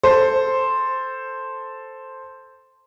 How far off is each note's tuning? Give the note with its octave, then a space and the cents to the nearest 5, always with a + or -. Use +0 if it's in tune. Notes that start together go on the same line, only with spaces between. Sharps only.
A4 +0 C5 +0